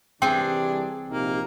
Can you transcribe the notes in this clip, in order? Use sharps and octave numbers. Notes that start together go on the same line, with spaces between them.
C2 E3 G3 C4 D4 G#4 G5
A#1 C3 A#3 D#4